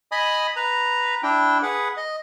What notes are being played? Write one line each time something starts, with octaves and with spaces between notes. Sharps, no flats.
D#5 G#5 B5 D#6
B4 A#5
D4 E4 G5
G#4 B4 F#5
D#5